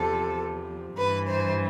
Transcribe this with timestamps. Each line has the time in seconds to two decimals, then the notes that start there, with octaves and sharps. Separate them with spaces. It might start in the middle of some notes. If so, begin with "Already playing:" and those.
Already playing: E2 C3 F3 A4
0.97 G2 E3 B4
1.28 C5